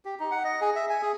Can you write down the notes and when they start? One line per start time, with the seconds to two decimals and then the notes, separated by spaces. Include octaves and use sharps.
0.05 G4
0.20 D#4
0.31 F#5
0.44 D#5
0.61 G#4
0.76 E5
0.90 G#5
1.02 G#4